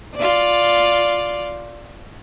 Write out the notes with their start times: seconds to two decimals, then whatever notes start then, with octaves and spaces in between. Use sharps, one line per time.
0.16 F4 D5